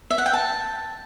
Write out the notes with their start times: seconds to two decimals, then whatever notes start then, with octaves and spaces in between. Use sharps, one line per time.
0.10 E5
0.18 F#5
0.26 G5
0.33 A5